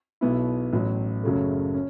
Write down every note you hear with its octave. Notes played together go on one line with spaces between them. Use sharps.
B1 B2 B3 E4
A1 A2 F#3
F#1 F#2 C#3 F#3 A3
C#4